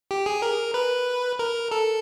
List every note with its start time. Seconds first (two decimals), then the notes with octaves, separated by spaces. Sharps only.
0.11 G4
0.26 G#4
0.42 A#4
0.74 B4
1.39 A#4
1.71 A4